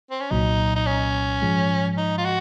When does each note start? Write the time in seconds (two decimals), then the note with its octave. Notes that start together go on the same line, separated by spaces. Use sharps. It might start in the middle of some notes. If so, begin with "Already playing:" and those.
0.11 C4
0.21 C#4
0.31 C2 A#2 F#3 D#4
0.76 D#4
0.87 C#4
1.42 G#2 F3 G#3
1.97 D#4
2.18 F4
2.25 F#4